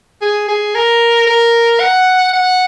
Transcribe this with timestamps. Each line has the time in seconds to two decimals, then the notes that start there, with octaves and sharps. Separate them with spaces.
0.22 G#4
0.48 G#4
0.75 A#4
1.27 A#4
1.80 F#5
2.33 F#5